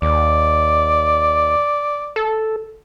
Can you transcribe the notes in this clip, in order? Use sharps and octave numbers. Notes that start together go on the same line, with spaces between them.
D#2 D5
A4